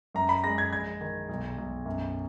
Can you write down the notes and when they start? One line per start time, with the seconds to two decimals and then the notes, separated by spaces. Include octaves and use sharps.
0.14 F#2 A#5
0.29 B5
0.44 G#3 A#6
0.58 G#6
0.73 A#1 G#6
1.01 D#3
1.29 B1
1.58 B1
1.86 F#2